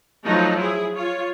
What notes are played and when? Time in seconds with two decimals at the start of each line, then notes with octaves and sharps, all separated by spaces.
0.25 F3 F#3 A3 D#4
0.59 E4 G#4
0.95 F4 C#5